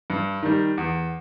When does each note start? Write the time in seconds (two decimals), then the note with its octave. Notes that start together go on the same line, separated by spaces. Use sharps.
0.10 G2
0.43 D#3 G3
0.78 E2